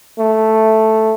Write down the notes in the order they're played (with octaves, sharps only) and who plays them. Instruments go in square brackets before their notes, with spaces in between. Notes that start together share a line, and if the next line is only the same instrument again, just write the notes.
[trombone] A3